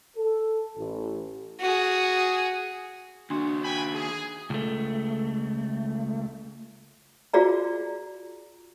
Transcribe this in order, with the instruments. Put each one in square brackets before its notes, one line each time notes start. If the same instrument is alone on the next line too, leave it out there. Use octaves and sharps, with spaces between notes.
[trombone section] A4
A1
[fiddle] F#4 G#4
[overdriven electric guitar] D#2 F#4 [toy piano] D4 C6 C#6
[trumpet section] G5 G#5 B5
G#4
[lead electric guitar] C#2 A3
[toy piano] F4 F#4 G#4 D5 A#5